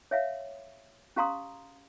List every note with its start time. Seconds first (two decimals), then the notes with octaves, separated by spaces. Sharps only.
0.11 C#5 E5 F5
1.16 C#4 G4 F5 A#5 C6 D#6